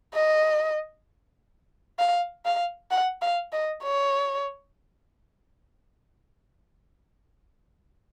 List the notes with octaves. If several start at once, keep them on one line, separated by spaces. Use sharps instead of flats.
D#5
F5
F5
F#5
F5
D#5
C#5